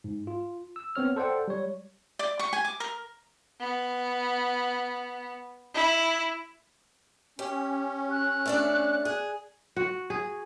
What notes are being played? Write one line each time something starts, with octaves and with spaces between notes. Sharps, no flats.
G#2
F4
E6
B3 C4 C#5 F6
A4 C5 D5 F#5 G5
G3 C#5
D5
C#6
G#5
D6
A#4
B3
E4
C#4 G4
F#6
A3 D4 D5
G#4
F#4
G#4